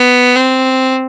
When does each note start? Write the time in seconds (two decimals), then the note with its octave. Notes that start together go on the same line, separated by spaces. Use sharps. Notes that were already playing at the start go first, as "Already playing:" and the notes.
Already playing: B3
0.36 C4